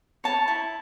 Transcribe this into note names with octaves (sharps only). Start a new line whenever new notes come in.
C#5 A5
E4